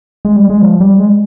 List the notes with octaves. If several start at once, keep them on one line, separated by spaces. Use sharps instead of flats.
G#3
G3
G#3
F3
G3
G#3